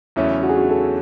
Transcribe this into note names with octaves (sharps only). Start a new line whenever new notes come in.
E2 C#3 F#3 A3 C#4 E4
F#4
G#4
F#4
A4